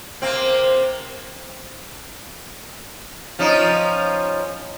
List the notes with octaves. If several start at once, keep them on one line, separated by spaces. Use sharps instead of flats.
C3 A#3 C4
F3 C#4 D#4